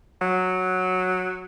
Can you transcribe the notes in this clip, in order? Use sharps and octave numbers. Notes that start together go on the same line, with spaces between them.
F#3